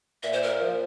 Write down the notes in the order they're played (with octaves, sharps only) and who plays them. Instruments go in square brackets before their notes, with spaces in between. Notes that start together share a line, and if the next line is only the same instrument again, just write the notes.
[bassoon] A#2 [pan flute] E5
[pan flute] C5
A#4
[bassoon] F3